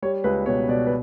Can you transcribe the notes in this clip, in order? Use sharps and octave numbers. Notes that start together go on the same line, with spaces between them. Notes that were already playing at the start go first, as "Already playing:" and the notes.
G3 C#5
C#2 B4
B2 C#5
B2 D5
B4